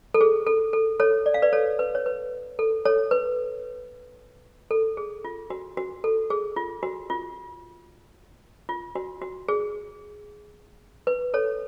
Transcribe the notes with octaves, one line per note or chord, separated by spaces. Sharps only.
A4
G#4
A4
A4
A4 C#5
D5
F5
B4 D5
A4 C#5
B4
C#5
B4
A4
A4 C#5
B4
A4
G#4
F4
F#4
F#4
A4
G#4
F4
F#4
F4
F4
F#4
F#4
G#4
B4
A4 C#5